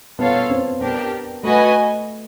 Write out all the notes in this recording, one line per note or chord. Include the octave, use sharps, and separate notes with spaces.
B3 F4 A4 C#5 F5
B3
C4
B3 D4 G4 A#4
A3 F#4 B4 D#5 G#5